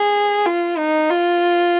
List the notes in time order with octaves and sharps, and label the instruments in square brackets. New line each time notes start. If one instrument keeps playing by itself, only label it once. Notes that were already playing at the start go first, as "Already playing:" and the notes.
Already playing: [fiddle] G#4
F4
D#4
F4